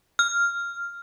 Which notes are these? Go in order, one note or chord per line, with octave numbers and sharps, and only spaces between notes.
F6